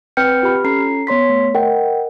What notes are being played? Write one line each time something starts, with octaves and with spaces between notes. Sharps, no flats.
C4 B4 G5 F6 G6 C#7
F4 G4 B5 F6
C#4 A4 A#5 C7
B3 C#5 C6 B6
A3
A#4 D#5 F#5 G5